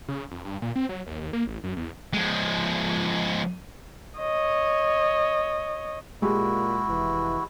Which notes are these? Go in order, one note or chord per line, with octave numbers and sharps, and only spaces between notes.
C#3
F2
G2
A#2
C4
F#3
D#2
D#2
A#3
A1
F#2
E2
F3 G#3
C#5 D#5
A#2 G#3 E4 F#4 G4
F1 E3